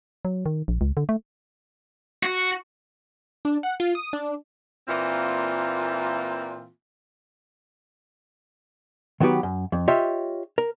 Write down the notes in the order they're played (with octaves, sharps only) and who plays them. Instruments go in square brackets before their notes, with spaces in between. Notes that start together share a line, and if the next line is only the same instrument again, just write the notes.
[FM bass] F#3
D#3
A#1
C#2
D3
A3
[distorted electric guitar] F#4
[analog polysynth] D4
F#5
F4
D#6
D4
[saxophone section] A#2 E3 A#3 C4 F4
[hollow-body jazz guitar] D#3 F#3 B3 F#4 G4 B4
F#2
F2
F4 G4 C#5 D#5 E5
A#4